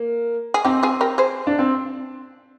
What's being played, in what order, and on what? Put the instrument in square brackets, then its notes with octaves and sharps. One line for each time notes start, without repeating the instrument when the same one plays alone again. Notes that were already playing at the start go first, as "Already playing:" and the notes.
Already playing: [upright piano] A#3
[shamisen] G#4
[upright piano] C4 [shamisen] D#4 G4
[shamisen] F4 G#4
G4 A#4
G#4 C5
[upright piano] D4
C4